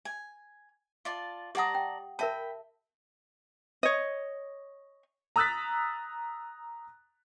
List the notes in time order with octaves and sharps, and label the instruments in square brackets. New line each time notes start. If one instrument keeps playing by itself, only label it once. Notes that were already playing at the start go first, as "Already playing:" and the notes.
[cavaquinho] G#5
F4 D5 A5
[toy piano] G4 F#5 D#6 [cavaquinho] D5 A5 A#5
[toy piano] G5
[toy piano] A#4 E5 A5 [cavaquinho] G5 B5
[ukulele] C#5 D#5
[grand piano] A#5 D#6 E6 F#6 A6 B6